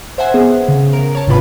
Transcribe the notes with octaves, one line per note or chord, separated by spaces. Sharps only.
C5 E5 F#5 G#5
B3 G#4
C#3
A#4
C#5 A5
G1 G#2 C3 F4 B4 B5